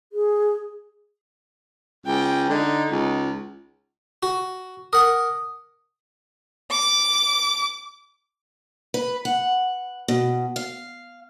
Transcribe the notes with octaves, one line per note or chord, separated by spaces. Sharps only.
G#4
C#2 G5
D3 D#4
C#2
F#4
A#4 F#5 D#6
D6
B4
F#5
B2
F5